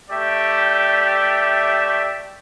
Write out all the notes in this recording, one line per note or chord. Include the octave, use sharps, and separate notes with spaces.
A3 G4 D5 E5